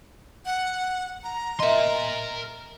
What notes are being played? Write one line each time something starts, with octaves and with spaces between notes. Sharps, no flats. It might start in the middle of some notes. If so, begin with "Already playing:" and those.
F#5
A#5
A#4 D#5 E5 C6